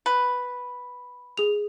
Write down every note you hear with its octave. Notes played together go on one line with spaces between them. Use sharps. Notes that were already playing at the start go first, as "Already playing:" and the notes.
B4
G#4 F7